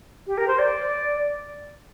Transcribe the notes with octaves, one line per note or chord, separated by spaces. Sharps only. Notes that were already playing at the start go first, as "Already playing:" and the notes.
G4
A#4
C5
D5